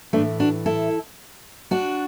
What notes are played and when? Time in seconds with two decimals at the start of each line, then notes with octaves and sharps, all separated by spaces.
0.13 A2 E3 A3 D4
0.40 D4 F#4
0.66 E4 A4
1.71 D4 F#4